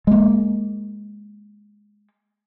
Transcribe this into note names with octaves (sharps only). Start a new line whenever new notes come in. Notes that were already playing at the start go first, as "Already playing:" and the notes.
G#3 A#3